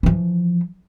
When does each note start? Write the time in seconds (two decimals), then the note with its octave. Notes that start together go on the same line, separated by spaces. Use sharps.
0.03 E3 F3